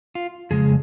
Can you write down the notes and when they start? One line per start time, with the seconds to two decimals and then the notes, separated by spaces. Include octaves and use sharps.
0.15 F4
0.51 F2 C#3 G#3 G#4